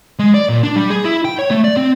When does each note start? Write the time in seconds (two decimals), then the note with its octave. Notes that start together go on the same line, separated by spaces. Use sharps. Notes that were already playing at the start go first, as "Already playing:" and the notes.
0.19 G#3
0.34 D5
0.49 A#2
0.63 D4
0.76 G3
0.90 G#4
1.05 E4
1.25 G5
1.39 C#5
1.51 A3
1.64 D5
1.77 C4